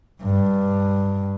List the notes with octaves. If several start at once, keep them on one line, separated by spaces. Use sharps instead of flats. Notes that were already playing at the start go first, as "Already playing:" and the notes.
G2